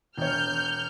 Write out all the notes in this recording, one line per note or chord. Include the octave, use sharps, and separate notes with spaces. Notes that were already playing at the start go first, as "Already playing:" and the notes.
E1 C#5 F6 G6